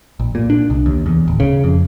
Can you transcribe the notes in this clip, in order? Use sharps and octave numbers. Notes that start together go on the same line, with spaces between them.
A#1
A#2
D4
C2
D#2
E2
D1
C#3
F2